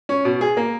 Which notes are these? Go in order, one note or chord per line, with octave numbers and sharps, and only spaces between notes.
C#4
B2
G#4
A#3